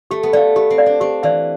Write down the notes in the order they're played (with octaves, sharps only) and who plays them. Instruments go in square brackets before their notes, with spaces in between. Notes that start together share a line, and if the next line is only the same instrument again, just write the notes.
[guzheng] A3 [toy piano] G4
[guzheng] B3
[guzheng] A3 [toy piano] D5 F5
[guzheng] B3 [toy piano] G4
[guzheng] C4
[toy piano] D5 F5
[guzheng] D4
[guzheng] C4 [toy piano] G4
[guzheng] E3 [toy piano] D5 F5